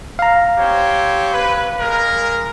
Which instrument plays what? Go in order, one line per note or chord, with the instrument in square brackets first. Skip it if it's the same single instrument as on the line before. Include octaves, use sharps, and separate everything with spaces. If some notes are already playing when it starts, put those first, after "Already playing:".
[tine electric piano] F5 A#5
[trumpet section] C4 G4 C#5
B4
G#3 A#4